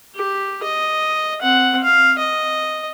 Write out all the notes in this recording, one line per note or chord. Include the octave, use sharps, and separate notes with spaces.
G4
D#5
C4 F#5
F5
D#5